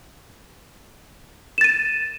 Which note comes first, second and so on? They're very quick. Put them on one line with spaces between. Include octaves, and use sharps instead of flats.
E7 A6 D#7